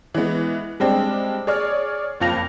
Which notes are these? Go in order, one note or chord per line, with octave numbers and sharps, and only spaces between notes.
E3 G#3 B3
G3 G#3 C4 D4
G#4 C#5 D5 F6
F#1 F2 F4 A#6 F7